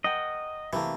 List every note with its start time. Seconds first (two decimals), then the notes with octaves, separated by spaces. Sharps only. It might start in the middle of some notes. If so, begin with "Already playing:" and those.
0.04 A#4 D#5 F#5 G5
0.73 C3 E3 A3 A#3